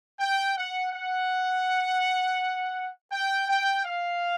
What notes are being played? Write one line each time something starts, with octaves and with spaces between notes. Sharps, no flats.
G5
F#5
F#5
G5
G5
F5